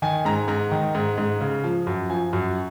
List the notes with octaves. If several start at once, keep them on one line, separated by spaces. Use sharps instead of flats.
D#3 G#5
G#2 A#5
G#2 A#5
D#3
G#2
G#2
C#3
F3
F#2
F3 G#5
F#2